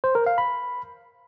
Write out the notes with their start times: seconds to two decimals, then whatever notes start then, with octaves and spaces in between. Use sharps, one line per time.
0.04 C5
0.15 A#4
0.26 F5
0.38 B5